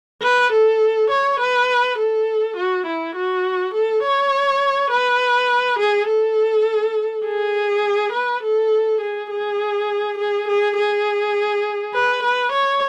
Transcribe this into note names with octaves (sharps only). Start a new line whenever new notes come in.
B4
A4
C#5
B4
A4
F#4
E4
F#4
A4
C#5
B4
G#4
A4
G#4
B4
A4
G#4
G#4
G#4
G#4
G#4
B4
B4
C#5